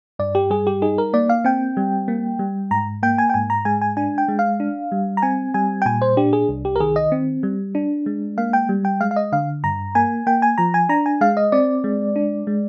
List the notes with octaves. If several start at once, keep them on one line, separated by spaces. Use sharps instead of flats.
G2 D5
G4
G3 G#4
G4
D#4 G#4
A#4
A#3 D5
F5
C4 G5
G3
A#3
G3
G#2 A#5
A#3 G5
G#5
G5
G#2 G#5
A#5
G#3 G#5
G#5
D4 G#5
G5
G#3
F5
D4
G3
A#5
C4 G#5
G3 G#5
G5
A#2 G#5
C5
D4 G4
G#4
C2
G4
A#4
D#3 G#4
D#5
C4
G3
D4
G#3
A#3 F5
G5
G3
G5
G#3 F5
F5
D#5
D3 F5
G2 A#5
A#3 G#5
A#3 G5
G#5
F3 A#5
G#5
D4 A#5
G#5
G#3 F5
D#5
C4 D5
G#3
D4
G#3